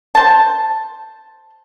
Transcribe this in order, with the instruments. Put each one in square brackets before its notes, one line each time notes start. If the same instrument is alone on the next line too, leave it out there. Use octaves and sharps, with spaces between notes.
[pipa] C5 A5